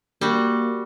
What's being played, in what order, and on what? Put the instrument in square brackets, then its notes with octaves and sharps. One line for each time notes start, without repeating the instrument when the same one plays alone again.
[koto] G3 F#4 [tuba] A#3